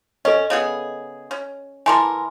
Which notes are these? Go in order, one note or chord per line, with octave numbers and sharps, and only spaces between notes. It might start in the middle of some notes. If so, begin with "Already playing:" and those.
C#4 A4 D#5
C#3 B3 G#4
C#4
E3 A4 A#4 G#5 C6 D6